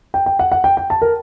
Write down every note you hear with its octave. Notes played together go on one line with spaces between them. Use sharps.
G5
G5
F#5
F#5
G5
G5
A5
A#4